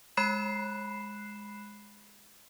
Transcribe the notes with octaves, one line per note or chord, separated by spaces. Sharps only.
G#3 B5 F#6 C7 E7